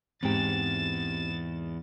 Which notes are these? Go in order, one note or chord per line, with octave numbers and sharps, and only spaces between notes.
E2 G#2 C4 G4 G5 A6 E7